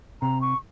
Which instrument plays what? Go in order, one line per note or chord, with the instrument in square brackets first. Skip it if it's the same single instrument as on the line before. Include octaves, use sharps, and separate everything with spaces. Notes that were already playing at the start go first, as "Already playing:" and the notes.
[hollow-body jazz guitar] C3 [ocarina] A#5
[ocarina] C#6